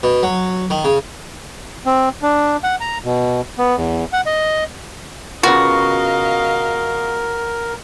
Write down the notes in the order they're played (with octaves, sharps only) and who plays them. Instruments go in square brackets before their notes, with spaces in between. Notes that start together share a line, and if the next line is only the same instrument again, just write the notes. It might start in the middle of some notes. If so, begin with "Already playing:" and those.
[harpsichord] B2
F#3
D#3
C#3
[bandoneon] C4
D4
F#5
A#5
B2
B3
E2
F#5
D#5
[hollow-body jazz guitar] C#3 B3 F4 [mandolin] F#4 [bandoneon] A#4 [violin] D#5 F5